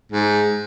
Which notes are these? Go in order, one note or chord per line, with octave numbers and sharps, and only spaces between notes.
G#2